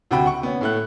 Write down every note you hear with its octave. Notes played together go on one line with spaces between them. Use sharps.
D2 C3 F#4 G5 B5
F#5 C#6
B3 C#4
A2 A3 F#6